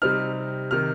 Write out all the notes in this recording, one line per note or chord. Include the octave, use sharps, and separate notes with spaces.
C3 G3 C4 D#4 F6
C3 D#3 F6